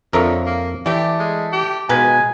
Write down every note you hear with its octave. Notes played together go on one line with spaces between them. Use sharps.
F2 D3 F3 A#4 C#5 E5
A#3
E3 A3 G4 D5
G#3
G4
B2 D#3 F3 G#3 B4 G#5